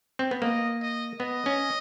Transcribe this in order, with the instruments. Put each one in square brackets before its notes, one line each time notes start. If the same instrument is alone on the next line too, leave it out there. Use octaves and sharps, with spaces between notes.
[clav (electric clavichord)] C4
B3
[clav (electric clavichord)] A#3 [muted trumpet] D#5
[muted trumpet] D#5
[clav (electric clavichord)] B3 [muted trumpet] D#5
[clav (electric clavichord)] C#4